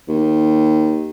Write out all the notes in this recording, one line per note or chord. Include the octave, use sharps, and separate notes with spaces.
D#2